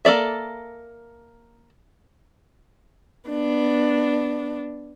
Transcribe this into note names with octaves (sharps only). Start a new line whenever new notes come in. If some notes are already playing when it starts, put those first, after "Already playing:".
A#3 A4 D5 E5
B3 D4